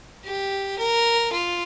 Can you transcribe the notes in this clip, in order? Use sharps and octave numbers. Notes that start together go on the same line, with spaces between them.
G4
A#4
F4